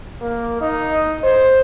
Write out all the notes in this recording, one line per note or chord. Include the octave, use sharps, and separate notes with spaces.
A#3
D#4
C5